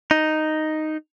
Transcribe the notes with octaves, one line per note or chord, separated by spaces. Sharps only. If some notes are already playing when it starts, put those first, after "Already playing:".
D#4